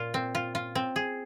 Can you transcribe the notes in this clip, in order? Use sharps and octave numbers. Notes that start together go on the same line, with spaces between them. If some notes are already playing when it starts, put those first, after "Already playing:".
Already playing: A#2 F4
C4
F4
F4
C4
G#4